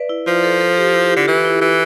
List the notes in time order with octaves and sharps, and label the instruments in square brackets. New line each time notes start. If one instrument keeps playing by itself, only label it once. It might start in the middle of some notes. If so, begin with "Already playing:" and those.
Already playing: [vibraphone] B4 D5 E5
E4
[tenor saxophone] F3 [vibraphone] F4
[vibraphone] A4
A4
A4
G4
E4
G4
F4
[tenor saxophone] D3
[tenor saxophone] E3 [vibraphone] G4
[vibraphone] E4
[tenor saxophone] E3